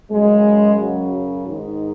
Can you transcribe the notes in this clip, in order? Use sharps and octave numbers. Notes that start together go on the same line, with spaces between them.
F#2 C#3 G#3
F#3
G#2 D#3